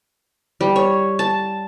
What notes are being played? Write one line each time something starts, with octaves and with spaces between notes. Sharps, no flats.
G3
C#5
A5